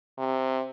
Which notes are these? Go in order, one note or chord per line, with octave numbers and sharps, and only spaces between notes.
C3